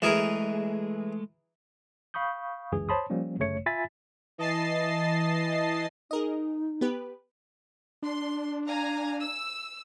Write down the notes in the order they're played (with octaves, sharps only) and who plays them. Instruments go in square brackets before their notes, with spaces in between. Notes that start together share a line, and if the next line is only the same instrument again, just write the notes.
[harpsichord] E3 G#4 A#4 [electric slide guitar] G#3 A3
[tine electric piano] F5 B5 C#6 D#6 G6
G1 C#2 F#2 E3 G#4
C5 C#5 A5 B5 C6 D#6
F3 G3 A#3 C#4
G1 F#2 C#3 A3 C#5 C#7
F4 E5 G#5 B5 A6 B6
[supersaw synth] E3 D#5 A5 A6 C7
[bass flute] D#4 [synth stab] G#4 A#4 D#5
[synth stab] B3 G4 B4
[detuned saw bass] D4 [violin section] C6
[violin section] F5 G#5 A#5
E6